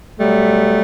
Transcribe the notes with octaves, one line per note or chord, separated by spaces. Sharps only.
B2 F#3 G3 A3